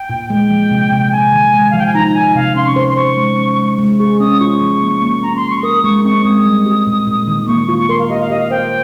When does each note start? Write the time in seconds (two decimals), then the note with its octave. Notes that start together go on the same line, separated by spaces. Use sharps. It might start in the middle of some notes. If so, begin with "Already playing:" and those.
Already playing: G5
0.10 A#2
0.30 G#3 G5
0.51 F3
0.71 C3
0.92 C3
1.12 C3 G#5
1.32 D#3
1.54 G#3
1.71 F3 F5
1.79 G5
1.86 G#5
1.94 D#4 A#5
2.08 A#5
2.15 G#3 G#5
2.35 C3 F5
2.55 C#4 C6
2.67 C#6
2.76 C5 C6
2.88 C6
2.96 C5 C#6
3.17 G#3
3.37 C#4
3.58 G#3
3.78 G#3
3.99 G#4 C#6
4.20 C#4 D#6
4.40 F4 C#6
4.61 F3
4.81 A#3
5.02 A#3
5.22 C#4 A#5
5.36 C6
5.43 G#3
5.50 C#6
5.63 A#4 D#6
5.84 G#3 C#6
6.05 C4 C#6
6.25 G#3 D#6
6.45 G3
6.66 G4
6.87 A#2
7.07 A#2
7.27 D#3
7.41 D#6
7.48 A#3 C#6
7.68 F4 C#6
7.78 C#6
7.89 A#4 C6
7.99 F5
8.09 G4 D#5
8.20 F5
8.30 G4 D#5
8.40 F5
8.51 C5 G5